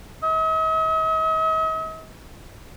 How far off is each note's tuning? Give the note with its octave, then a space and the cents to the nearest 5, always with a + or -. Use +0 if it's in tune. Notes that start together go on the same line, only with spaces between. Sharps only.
D#5 +45